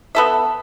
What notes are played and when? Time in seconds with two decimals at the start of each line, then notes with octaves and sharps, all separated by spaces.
0.15 B3 A4 E5